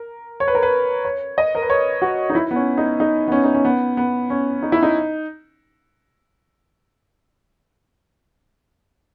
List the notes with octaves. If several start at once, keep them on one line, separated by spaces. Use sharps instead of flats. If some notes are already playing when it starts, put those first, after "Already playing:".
Already playing: A#4
C#5
B4
A#4
B4
C#5
D#5
A#4
B4
C#5
F#4
D#4
E4
B3
C#4
D#4
D#4
B3
C#4
D#4
C#4
B3
B3
C#4
D#4
E4
D#4